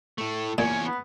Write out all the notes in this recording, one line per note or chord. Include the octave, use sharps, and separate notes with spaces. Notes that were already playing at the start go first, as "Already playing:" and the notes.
A2 A3
E2 A#2 C#4 G#5
B3